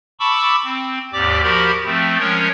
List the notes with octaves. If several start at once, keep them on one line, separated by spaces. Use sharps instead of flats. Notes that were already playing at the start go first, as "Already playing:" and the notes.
A5 B5 C#6 D6 E6
C4
D#2 G#2 G4 D5 D6
F3 F#4 G4 A#4 B5
F3 A3 C4
F3 G#3 C#4 A#4 C#5